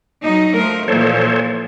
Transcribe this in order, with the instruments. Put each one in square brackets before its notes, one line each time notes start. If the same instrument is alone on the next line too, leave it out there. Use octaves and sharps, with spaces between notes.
[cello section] F#3 D#4
F3 A3 A#4
[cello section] A#2 E3 F3 [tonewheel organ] A4 C5 C#5